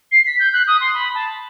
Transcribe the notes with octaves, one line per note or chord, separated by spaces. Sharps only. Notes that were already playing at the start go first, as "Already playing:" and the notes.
C7
B6
G6
F#6
D#6
C6
B5
A5